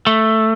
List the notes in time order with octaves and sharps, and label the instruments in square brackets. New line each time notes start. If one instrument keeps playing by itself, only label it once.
[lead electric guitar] A3